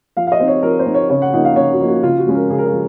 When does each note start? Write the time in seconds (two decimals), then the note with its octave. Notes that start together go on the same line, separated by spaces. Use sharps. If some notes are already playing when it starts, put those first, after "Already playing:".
0.17 F3 F5
0.27 F5
0.32 D#5
0.40 C4 D#4
0.48 C#5
0.63 F3 A#4
0.79 C5
0.86 C4 D#4
0.94 C#5
1.09 C#3 C#5
1.22 F#5
1.33 F3 A#3 D#4 F#5
1.45 F5
1.56 C#3 C#5
1.73 F#4
1.80 F3 A#3 D#4
1.88 F#4
2.03 C#3 F4
2.18 F#4
2.26 F3 G#3 C#4
2.35 A#4
2.49 C#3 G#4
2.58 A#4
2.65 G#4
2.73 F3